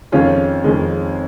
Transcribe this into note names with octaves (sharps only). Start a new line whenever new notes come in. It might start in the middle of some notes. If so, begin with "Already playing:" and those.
F2 D#3 G#3 C#4 F4
F2 D#3 G#3